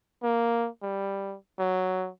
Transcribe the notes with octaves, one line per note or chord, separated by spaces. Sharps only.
A#3
G3
F#3